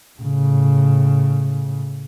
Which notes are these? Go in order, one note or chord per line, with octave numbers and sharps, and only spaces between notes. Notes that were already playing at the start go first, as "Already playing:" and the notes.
A2 C#3